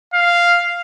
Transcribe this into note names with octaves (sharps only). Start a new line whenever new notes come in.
F5